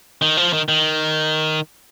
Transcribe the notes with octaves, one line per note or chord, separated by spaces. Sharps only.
D#3
F3
D#3
D#3